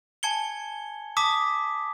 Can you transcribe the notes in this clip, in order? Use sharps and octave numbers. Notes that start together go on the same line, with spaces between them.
G#5 A5 G#6 C#7 G7
A5 D6 D#6 B6